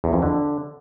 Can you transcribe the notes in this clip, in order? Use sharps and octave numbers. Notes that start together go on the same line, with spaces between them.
E2
F2
D3